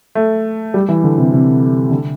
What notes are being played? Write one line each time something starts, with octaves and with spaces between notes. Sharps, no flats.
A3
G3
E3
D3
C3
C3
D3